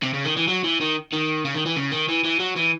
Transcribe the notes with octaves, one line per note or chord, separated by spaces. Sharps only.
C3
C#3
D#3
E3
F#3
E3
D#3
D#3
C#3
D#3
E3
C#3
D#3
E3
E3
F#3
E3